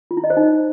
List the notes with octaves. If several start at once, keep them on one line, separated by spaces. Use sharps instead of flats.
F4
E4
D#5
C5
D#4